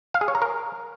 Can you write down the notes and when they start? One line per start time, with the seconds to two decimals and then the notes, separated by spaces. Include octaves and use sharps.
0.14 F5
0.21 G#4
0.28 C#5
0.35 A#5
0.42 A#4